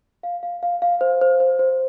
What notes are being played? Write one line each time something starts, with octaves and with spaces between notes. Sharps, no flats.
F5
F5
F5
F5
C5
C5
C5
C5